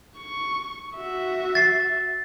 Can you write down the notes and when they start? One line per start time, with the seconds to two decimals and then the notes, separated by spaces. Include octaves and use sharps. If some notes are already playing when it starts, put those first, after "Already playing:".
0.17 C#6
0.96 F#4 E5
1.55 A6 C7